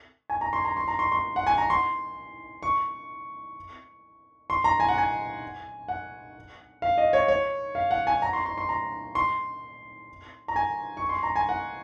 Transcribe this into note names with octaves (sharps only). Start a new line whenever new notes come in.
G#5
A#5
C6
A#5
C6
A#5
C6
C6
F#5
G#5
A#5
C6
C#6
C6
A#5
G#5
F#5
G#5
F#5
F5
D#5
C#5
C#5
F5
F#5
G#5
A#5
C6
C6
C6
A#5
C6
A#5
G#5
C#6
C6
A#5
G#5
F#5